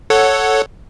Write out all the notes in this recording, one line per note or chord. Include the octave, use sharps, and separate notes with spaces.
A4 C#5 F#5